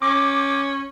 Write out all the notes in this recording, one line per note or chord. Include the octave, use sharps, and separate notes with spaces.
C#4 D6